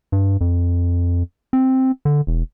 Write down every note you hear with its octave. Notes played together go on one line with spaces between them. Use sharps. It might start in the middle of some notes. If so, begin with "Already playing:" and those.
G2
F2
C4
D3
E1